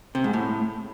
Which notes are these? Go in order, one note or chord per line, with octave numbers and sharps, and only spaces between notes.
C3
G#2
A2